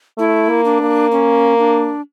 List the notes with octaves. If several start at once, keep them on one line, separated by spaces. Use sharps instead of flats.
A3 E4
A#3
D4
A#3
C#4
D4